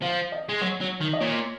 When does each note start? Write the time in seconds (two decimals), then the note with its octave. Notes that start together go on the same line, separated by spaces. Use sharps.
0.02 F3 F5
0.32 D#5
0.49 G#3
0.61 F#3 C#5
0.81 F#3
1.01 D#3
1.13 D#5
1.21 A#2 C#5